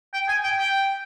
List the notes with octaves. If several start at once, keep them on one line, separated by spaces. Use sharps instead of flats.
G5
G#5
G5
G5